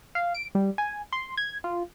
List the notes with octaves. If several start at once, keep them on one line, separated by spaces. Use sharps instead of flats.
F5
D7
G3
G#5
C6
G#6
F4